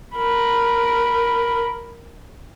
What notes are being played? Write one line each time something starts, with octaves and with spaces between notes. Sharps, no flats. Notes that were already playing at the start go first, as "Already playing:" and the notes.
A#4 B5